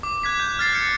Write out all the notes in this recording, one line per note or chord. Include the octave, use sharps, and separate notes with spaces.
D6
D6 F#6 G#6 B6
G6
F6 A6 C7
G6 C#7